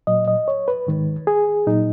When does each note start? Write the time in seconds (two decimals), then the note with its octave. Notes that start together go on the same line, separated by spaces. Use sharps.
0.07 A#2 F#3 D#5
0.28 D#5
0.48 C#5
0.68 B4
0.87 G#2 D#3 G#3
1.27 G#4
1.67 A#2 F#3 D#4